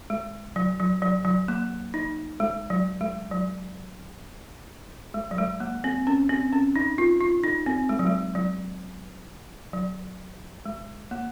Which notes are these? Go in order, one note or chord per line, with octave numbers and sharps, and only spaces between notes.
G#3
F#3
F#3
F#3
F#3
A#3
D#4
G#3
F#3
G#3
F#3
G#3
F#3
G#3
A#3
C4
C#4
C4
C#4
D#4
F4
F4
D#4
C4
G#3
F#3
G#3
F#3
F#3
G#3
A#3